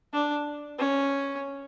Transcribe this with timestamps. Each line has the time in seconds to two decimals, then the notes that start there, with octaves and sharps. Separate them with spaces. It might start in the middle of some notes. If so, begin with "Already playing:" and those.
0.13 D4
0.79 C#4